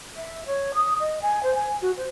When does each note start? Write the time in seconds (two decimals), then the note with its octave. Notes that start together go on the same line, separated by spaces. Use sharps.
0.17 E5
0.46 C#5
0.74 D#6
1.00 D#5
1.22 G#5
1.43 C5
1.54 G#5
1.82 F#4
1.97 C5